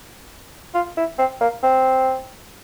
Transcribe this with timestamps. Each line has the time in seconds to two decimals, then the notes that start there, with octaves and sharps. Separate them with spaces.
0.74 F4
0.97 E4
1.18 C4
1.41 A#3
1.63 C4